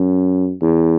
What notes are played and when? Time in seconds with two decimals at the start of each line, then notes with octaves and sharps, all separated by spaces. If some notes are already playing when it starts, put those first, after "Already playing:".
Already playing: F#2
0.62 E2